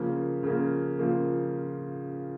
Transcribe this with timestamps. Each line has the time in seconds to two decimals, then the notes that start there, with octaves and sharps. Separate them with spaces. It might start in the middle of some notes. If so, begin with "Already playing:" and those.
Already playing: C#3 F3 A#3
0.43 C#3 F3 A#3
0.99 C#3 F3 A#3